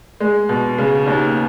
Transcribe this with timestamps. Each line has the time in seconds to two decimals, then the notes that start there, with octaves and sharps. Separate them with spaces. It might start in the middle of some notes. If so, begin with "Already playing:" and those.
0.20 G#3
0.49 B2
0.78 C#3
1.07 D#2